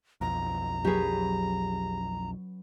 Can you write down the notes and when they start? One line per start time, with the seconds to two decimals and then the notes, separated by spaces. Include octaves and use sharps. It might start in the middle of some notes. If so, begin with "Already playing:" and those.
0.21 B1 F2 A#5
0.85 F#3 C#4 G4 G#4 B4